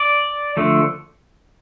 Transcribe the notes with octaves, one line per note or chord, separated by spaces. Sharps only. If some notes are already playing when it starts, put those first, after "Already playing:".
Already playing: D5
D3 F3 A3